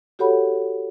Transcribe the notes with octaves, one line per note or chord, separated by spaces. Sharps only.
F#4 G4 A4 C#5 F#5 B5